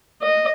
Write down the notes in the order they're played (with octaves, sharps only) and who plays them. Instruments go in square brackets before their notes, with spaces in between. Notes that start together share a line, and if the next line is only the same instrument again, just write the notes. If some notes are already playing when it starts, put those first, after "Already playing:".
[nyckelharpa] D#5